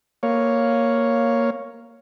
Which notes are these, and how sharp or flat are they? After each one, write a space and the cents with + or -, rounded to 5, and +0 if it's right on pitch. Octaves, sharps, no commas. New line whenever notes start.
A#3 +0 C#5 +0 F5 +0